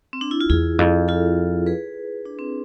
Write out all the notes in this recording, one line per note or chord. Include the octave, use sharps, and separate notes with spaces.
C4
D4
E4
F4
E2 E4 G#4
F2
F4 A4
G#4 B4
D4
C4